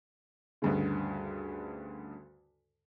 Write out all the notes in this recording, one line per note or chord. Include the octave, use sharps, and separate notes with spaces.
D2 G2 C#3